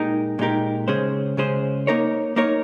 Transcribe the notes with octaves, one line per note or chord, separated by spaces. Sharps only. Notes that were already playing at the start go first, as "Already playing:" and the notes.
Already playing: A#2 G#3 D#4 G4 A#4
A#2 G#3 D#4 G4 A#4
C#3 G#3 C#4 G#4 C5
C#3 G#3 C#4 G#4 C5
A#3 D#4 A#4 C#5
A#3 D#4 A#4 C#5